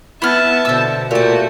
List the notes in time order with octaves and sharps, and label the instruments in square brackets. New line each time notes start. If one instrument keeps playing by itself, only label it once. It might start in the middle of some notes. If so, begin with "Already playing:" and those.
[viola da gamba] B3 [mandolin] E4 F#5 F6 [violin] E5 A5
[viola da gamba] B2 D3 [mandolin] C5 E6
[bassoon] A#2 [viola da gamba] A3 [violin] F#4 [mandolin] G4 A5